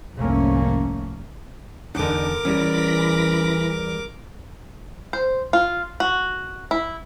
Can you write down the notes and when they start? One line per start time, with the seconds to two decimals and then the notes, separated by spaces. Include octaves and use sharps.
0.15 F1 C2 G#2 A3 A#3 C#4
1.95 E2 D3 D4 D#4 A#4 D6
2.45 E2 E3 G3 C#4 B5 A#6
5.13 C5
5.53 F4
6.00 F#4
6.71 E4